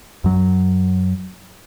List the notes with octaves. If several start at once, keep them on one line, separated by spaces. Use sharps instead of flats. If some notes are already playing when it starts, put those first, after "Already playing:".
F#2 F#3